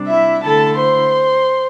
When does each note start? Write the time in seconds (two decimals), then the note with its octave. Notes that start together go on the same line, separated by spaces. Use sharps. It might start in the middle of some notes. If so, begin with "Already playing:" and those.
Already playing: C3 G3 D4
0.08 E4 E5
0.43 D3 A3 E4 A4 A5
0.78 C5 C6